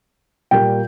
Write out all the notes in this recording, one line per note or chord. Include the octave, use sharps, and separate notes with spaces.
A#2 G3 A#3 G5